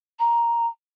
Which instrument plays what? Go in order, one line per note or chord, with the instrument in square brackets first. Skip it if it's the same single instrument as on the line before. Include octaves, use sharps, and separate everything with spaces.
[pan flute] A#5